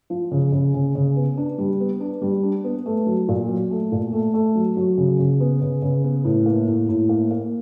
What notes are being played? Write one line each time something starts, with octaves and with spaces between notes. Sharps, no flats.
F3
C#3
C#3
C#3
C#3
B3
D4
G3
B3
D4
G3
D4
B3
A3
F#3
A#2
F#3
A3
A#2
A3
A3
F#3
F#3
C#3
C#3
B3
C#3
C#3
B3
A2
A#3
A2
A2
A#3
A#3